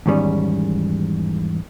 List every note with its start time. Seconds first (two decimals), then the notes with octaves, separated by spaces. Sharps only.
0.06 E2 G#2 D#3 G3 C#4